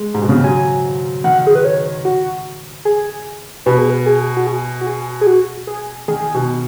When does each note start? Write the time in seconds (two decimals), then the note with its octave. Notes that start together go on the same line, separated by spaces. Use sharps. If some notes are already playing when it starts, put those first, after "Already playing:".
Already playing: G#3
0.14 G#2
0.22 B2
0.29 C#3
0.36 D#3
0.43 F#3 G#5
1.24 D#3 F#5
1.47 G#4
1.55 B4
1.65 C#5
2.05 F#4
2.85 G#4
3.66 B2 B4
3.78 G#4
3.90 B4
4.06 G#4
4.37 F#4
4.47 G#4
4.81 F#4
4.87 G#4
5.21 G#4
5.27 F#4
5.67 G#4
6.08 D#3 G#4
6.35 B2